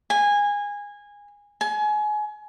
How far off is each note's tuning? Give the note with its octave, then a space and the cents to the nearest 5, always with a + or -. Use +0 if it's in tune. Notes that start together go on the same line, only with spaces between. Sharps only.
G#5 -20
G#5 +30